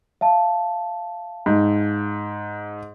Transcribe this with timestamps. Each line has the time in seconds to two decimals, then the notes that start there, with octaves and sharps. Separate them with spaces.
0.21 E5 F5 A5
1.46 G#2